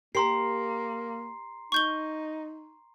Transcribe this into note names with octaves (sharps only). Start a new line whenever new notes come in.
A#3 G4 A#4 A#5 C6 C7
D#4 C#6 G6 G7